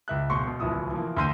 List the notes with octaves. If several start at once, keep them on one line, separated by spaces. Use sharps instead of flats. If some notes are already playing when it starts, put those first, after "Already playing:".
C#2 E5 F#6
E1 C6 C#6
B2
D1 C2 F3 E4 D#6 E6
E3 F3 A#3
D2 D3 C6 G6 D#7